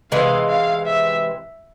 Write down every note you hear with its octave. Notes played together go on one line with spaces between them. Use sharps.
C3 E3 G#3 F5
F5
E5